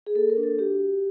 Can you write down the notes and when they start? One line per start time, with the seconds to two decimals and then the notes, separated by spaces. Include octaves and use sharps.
0.07 G#4
0.15 A#3 A4
0.30 A#4
0.37 D4
0.43 A4
0.58 F#4 G4